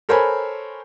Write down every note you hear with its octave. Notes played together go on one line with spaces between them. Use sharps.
A4 A#4 C5 C#5 G#5 B5